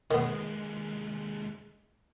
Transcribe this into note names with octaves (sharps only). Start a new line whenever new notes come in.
D#2 D#3 G#3 B3